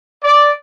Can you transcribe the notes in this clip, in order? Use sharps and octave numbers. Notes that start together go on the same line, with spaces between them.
D5